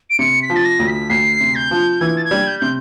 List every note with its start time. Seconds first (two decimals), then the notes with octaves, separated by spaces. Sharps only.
0.10 D7
0.19 C3 C#7
0.42 B6
0.50 F3
0.56 A6
0.65 A#6
0.79 D2
0.87 B6
1.09 D2 C7
1.40 C3
1.55 G6
1.71 F3
2.01 E3 G#6
2.17 A6
2.24 G#6
2.31 G3
2.47 G6
2.59 C3 G6